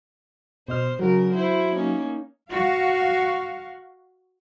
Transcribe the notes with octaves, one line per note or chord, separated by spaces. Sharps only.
B2 C5 D#5 F6
C#3 F#3 F#4 A#4
E4 C5
A#3 C#4 D#4
F#4 F5